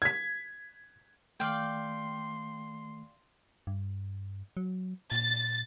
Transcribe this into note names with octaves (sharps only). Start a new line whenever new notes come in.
G#6 B6
D#3 A3 D5 F5 G5 C6
G2
F#3
A#2 A6